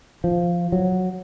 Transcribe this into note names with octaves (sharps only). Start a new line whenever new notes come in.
F3
F#3